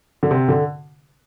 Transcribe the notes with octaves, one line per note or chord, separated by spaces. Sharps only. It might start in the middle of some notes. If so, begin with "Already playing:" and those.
D3
C3
D3